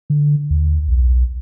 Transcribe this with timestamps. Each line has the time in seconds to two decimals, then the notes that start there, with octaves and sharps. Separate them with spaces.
0.10 D3
0.50 D#2
0.88 B1